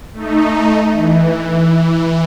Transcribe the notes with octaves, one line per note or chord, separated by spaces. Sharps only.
A3 D#4
E3